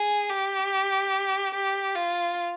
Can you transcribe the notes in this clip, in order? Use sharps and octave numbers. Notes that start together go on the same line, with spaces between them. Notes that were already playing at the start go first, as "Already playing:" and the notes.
Already playing: G#4
G4
G4
F4